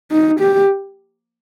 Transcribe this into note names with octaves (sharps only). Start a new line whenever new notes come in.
D#4
G4